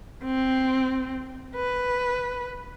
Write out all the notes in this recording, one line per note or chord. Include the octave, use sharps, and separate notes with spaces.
C4
B4